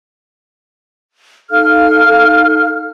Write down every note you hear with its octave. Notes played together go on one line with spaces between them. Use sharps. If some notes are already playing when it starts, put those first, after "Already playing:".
D#4 A4 F5 F6